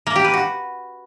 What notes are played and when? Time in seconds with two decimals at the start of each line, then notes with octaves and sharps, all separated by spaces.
0.07 A#3
0.16 G4
0.25 B4
0.34 F#4